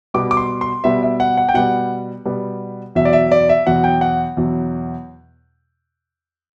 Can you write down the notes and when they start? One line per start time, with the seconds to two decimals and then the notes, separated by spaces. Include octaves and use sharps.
0.14 B2 G3 B3 D6
0.31 D6
0.37 C6
0.61 C6
0.84 B2 G3 B3 E5
1.03 E5
1.20 F#5
1.37 F#5
1.49 G5
1.54 B2 G3 B3 F#5
2.25 B2 G3 B3
2.95 E2 B2 F#3 E5
3.05 D5
3.13 E5
3.32 D5
3.49 E5
3.67 E2 B2 F#3 F#5
3.84 G5
4.01 F#5
4.37 E2 B2 F#3